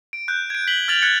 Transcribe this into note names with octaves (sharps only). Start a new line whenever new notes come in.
D7
F#6 G6
G#6 D7
B6 F#7 G7
F6 G#6 A6 F7 F#7
F#6 G#6 A6 B6 C#7